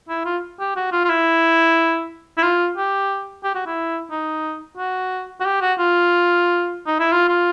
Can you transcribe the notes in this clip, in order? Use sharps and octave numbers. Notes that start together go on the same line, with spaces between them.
E4
F4
G4
F#4
F4
F4
E4
E4
F4
G4
G4
F#4
E4
D#4
F#4
F#4
G4
F#4
F4
D#4
E4
F4
F4